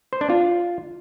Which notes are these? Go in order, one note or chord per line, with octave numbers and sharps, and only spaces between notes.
C5
D4
F4